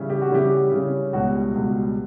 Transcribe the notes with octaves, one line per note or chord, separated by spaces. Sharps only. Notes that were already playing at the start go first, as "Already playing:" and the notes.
Already playing: C#3 E3 G3 C#4 E4
G4
F#4
C#3 E3 G3 C#4 E4 G4
C#3 E3 G3 C#4 E4
C#2 B2 G3 F#4
C#2 B2 G3